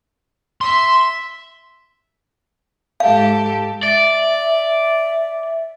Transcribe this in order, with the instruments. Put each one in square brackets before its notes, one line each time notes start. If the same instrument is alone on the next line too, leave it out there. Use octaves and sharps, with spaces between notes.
[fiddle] E5 [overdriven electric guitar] C6
[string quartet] G#2 G4 A4 [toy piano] F5
[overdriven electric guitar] D5 [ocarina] E5